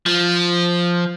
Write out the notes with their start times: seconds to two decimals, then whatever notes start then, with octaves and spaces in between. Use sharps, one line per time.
0.06 F3